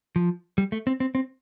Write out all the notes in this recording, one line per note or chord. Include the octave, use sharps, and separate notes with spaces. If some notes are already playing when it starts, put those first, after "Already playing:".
F3
G3
A3
C4
C4
C4